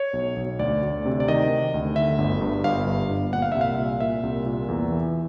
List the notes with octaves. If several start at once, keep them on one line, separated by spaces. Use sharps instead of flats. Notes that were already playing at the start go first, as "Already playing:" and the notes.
Already playing: C#5
B1
B1
D2 D5
D2
C3
D5
D#3 D#5
D#3
D2
D3 E5
G1
G2
G1 F5
G2
G1
A#2 F#5
F5
C2 E5
F5
A#2
A#2 E5
C2
A#2
E2
E3